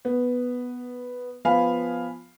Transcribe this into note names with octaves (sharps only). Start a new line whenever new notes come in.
B3
F3 B3 F5 G#5 B5